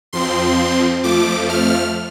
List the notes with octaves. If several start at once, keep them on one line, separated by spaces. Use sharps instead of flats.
F2 F3 C4 C6
F2 F3 A3 D6
F6